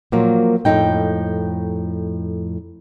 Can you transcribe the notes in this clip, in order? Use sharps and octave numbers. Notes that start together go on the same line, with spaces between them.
A#2 F3 F#3 A#3
F2 A2 D3 G#3 D#4 G5